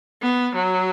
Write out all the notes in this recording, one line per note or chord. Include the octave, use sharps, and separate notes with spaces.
B3
F#3